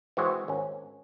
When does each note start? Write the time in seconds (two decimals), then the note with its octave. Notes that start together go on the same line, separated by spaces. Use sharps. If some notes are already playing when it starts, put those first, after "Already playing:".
0.17 E3 G#3 C4 F#4 G#4 C5
0.48 G#1 C#4